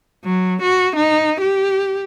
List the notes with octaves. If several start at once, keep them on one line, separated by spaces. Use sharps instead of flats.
F#3
F#4
D#4
G4